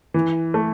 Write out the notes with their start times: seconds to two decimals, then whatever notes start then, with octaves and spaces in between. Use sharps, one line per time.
0.14 E3
0.54 A3